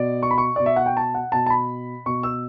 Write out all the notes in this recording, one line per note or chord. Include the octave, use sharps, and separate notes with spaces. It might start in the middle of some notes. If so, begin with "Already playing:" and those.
Already playing: B2 D5
C#6
B5
C#6
B2 D5
E5
F#5
G5
A5
F#5
B2 A5
A5
B5
B2 C#6
E6